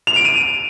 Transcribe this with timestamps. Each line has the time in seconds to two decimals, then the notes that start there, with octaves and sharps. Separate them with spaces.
0.07 F7
0.16 D7
0.25 D#7